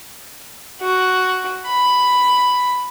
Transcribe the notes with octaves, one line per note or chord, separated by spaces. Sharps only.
F#4
B5